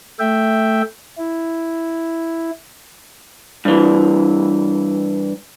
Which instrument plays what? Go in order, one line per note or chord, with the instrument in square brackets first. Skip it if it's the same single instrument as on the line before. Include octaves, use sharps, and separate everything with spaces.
[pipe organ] A3 E5 G5
E4
[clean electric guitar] G2 E3